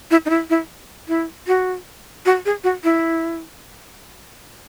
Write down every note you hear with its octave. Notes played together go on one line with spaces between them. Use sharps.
E4
D#4
E4
E4
E4
F#4
F#4
G#4
F#4
E4